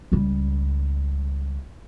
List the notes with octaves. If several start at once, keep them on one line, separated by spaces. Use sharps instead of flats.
C#2 G3